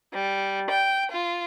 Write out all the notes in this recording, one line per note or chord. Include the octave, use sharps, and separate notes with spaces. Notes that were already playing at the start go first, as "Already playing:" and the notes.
G3
G5
F4